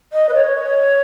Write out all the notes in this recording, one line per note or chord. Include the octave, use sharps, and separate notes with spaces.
D#5
B4
C#5